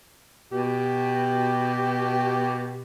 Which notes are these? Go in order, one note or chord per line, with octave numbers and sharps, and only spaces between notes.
B2 G4